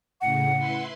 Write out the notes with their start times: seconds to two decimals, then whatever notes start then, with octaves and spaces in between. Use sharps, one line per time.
0.21 A2 C#3 F#5
0.57 E4 B4 C6